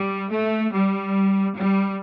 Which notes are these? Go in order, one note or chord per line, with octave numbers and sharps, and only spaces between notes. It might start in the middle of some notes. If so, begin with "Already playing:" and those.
Already playing: G3
A3
G3
G3